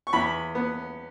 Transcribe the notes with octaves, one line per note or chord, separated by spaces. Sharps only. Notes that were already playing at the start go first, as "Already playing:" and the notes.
C#6
E2 B5
B3